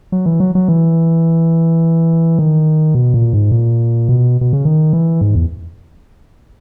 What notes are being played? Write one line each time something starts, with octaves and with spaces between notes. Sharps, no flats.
F#3
E3
F#3
F#3
E3
D#3
B2
A#2
G#2
A#2
B2
B2
C#3
D#3
E3
G#2
E2